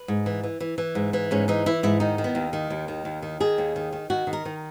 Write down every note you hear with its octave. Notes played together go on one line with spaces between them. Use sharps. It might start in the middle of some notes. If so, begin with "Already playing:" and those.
Already playing: B4
G#2
E3
E3
E3
E3
G#2
E3
G#2 C#4
E3 D#4
E3 E4
G#2 E4
D#3 D#4
D#3
B3
D#2
D#3
D#2
D#3
D#2
D#3
D#3 G#4
D#2
D#3
D#3
D#3 F#4
D#3
A#4
D#3